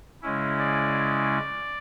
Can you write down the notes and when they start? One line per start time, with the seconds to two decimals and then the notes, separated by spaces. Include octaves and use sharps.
0.22 C#3 G#3 C#4 E4
0.59 D5